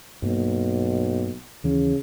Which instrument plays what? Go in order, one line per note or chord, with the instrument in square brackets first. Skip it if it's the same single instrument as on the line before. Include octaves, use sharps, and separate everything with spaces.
[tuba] B1 [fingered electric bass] G2 A#3
[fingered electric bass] D#2 E3 C#4 [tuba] C#3